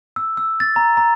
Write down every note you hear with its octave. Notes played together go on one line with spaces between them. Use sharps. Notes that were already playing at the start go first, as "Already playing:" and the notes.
E6
E6
A6
A#5
A#5